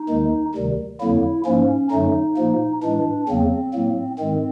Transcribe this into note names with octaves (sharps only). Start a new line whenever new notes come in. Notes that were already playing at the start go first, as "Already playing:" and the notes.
Already playing: D#4
D#2 D#3 G#3
D2 C3 D#3 G3
F2 D3 F#3 A#3 E4
G#2 F3 A#3 C#4
F#2 D3 F#3 A3 D#4
A#2 F3 A#3
A2 E3 G#3 D4
E2 C#3 F#3 A#3 C4
A2 F#3 A#3
G#2 D#3 G#3 C4